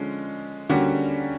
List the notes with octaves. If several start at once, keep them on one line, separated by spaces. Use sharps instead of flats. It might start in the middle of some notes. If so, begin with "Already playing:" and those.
Already playing: D3 F3 G#3 C#4
D3 G3 A#3 C#4 F#4